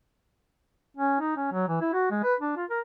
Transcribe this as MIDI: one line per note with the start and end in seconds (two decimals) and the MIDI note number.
0.97 1.20 61
1.20 1.35 63
1.36 1.47 61
1.52 1.66 54
1.68 1.79 52
1.81 1.91 64
1.93 2.09 66
2.11 2.19 56
2.23 2.34 71
2.40 2.56 62
2.56 2.64 65
2.70 2.80 70